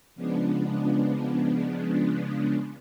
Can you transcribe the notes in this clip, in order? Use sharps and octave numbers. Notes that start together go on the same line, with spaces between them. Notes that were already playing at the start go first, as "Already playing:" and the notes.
C#3 F3 G#3 B3 D4